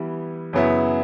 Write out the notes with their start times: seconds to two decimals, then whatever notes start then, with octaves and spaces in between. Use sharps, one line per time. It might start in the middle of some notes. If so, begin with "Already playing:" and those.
Already playing: E3 G3 B3 E4
0.53 F#2 C#3 F#3 B3 E4